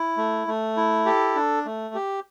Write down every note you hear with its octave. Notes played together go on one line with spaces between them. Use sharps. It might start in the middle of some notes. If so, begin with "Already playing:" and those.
Already playing: E4
A3
A3
E4
G4 A4
D4
A3
G4